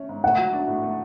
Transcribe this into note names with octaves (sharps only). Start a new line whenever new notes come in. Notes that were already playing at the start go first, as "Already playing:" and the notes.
Already playing: A3 C#4
G#2
A3 F#5
F#3
D4
A2
A3